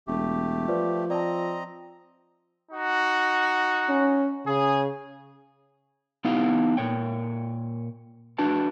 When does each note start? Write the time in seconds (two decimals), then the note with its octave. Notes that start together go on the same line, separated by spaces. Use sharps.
0.07 E1 A3 G4
0.68 F3 B4 C5 D5
1.10 C4 D5 D#5 A5 A#5
2.72 D#4 F#4
3.89 C#4
4.47 C#3 G#4
6.25 B3 D#4 E4 G4 F5
6.77 A#2 C#5 G5
8.38 D4 F#4 B4 A5